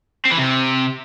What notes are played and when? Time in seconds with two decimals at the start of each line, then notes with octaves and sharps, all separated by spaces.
0.25 C4
0.31 E3
0.38 C3